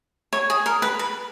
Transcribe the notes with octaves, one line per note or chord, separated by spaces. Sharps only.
C#5
G#4
A#4
B4
B4